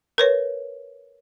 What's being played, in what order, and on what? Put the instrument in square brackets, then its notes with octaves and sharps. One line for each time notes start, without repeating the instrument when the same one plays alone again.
[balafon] A#4 B4 C#5